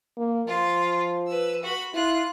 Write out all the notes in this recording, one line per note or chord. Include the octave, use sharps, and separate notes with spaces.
A#3
F3 F4
B4 E6
F#4 B5
E4 F4 F#6